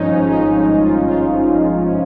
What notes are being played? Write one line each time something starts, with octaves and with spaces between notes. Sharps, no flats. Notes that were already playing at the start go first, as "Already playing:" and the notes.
Already playing: G#1 G2 F3 G#3 C#4 D#4
C#4
G#1 G2 F3 G#3 D#4
D#4
G#1 G2 F3 G#3 F4
F4
G#1 G2 F3 G#3
C3 F3 C#4